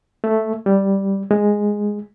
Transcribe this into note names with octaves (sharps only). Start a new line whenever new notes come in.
A3
G3
G#3